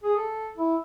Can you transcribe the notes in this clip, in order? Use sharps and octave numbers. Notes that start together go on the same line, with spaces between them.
G#4
A4
E4